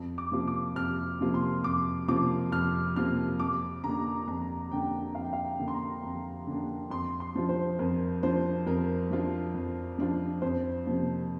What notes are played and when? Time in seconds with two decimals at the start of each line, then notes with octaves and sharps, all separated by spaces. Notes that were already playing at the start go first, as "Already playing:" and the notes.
Already playing: F2
0.18 D6
0.32 C3 F3 A#3 F4
0.47 D6
0.76 F2 F6
1.20 C3 F3 A#3 F4
1.34 C6
1.63 F2 D6
2.08 C3 F3 A#3 F4 D6
2.52 F2 F6
2.96 C3 F3 A#3 F4 F6
3.40 F2 D6
3.83 D3 A#3 D4 A#5
4.28 F2 A#5
4.71 D3 A#3 D4 G5
5.15 F2 F5
5.24 G5
5.33 F5
5.45 G5
5.59 D3 A#3 D4
5.68 C6
5.74 A#5
6.04 F2
6.47 D3 A#3 D4
6.90 F2 C6
7.20 C6
7.35 F3 D4 F4
7.49 C5
7.79 F2 A#4
8.23 F3 D4 F4 C5
8.67 F2 A#4
9.11 F3 D4 F4
9.54 F2
9.99 F3 D4 F4
10.42 F2 C5
10.86 C3 F3 A#3